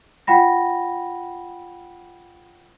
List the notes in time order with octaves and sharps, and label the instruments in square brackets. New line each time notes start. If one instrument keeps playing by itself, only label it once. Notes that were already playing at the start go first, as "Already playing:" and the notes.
[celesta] F4 F#5 G5 B5 A#6